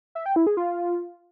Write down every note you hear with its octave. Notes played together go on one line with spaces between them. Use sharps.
E5
G5
E4
G#4
F4